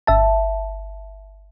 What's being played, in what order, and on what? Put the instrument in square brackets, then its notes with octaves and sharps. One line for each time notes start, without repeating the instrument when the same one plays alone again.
[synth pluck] G1 E5 A5